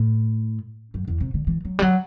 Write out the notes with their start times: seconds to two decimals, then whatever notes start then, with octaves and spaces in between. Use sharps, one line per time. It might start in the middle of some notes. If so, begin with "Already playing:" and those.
Already playing: A2
0.94 F#2
1.08 E2
1.20 C3
1.34 D3
1.47 E3
1.65 F#3
1.79 G3
1.82 F#3